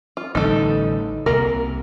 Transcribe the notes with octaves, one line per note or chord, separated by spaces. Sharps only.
F4
A1 D3 G3 D#4 A4
C2 C3 A#3 A#4